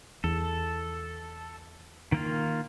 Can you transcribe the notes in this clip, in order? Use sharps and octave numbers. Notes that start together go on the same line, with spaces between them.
E2 A4
D#3 A#3 F4